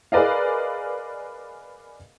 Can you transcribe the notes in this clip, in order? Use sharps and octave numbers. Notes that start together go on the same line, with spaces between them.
G#4 A#4 B4 D5 D#5 F5